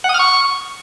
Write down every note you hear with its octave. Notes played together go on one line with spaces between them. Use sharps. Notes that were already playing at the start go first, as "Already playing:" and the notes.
F#5
D#6
F6
C#6